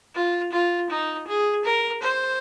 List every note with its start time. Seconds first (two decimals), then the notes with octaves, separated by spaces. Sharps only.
0.15 F4
0.52 F4
0.90 D#4
1.27 G#4
1.64 A#4
2.03 C5